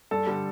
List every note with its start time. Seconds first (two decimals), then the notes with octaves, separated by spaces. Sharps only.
0.11 G2 A4
0.27 D3 G3